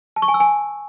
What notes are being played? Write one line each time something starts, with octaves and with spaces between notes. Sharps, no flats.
A5
C#6
G#5
E6
G#5